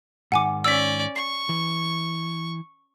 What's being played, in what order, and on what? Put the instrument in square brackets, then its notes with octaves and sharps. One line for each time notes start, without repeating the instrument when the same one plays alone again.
[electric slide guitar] G#2 D#3 [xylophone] F#5 G#5 D6
[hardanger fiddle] C#4 D5 [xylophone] E6 B6
[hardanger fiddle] C#6 [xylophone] C7
[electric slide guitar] E3